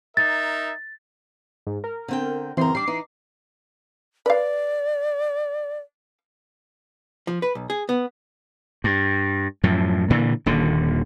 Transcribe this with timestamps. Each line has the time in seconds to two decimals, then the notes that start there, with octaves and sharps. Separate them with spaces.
0.17 D#4 A#4 E5 A6
1.67 G#2
1.84 A#4
2.08 D3 C4 G5
2.57 F#2 C#3 E3 C4 A#4 C6
2.75 G3 D4 D6 C7
2.88 E3 D#4
4.26 B4 D5 F5
7.27 F3
7.42 B4
7.55 B1
7.70 G#4
7.89 B3
8.84 G2
9.64 F#2 A2 F3
10.10 A#2 D3 E3
10.46 D#1 D#2 D3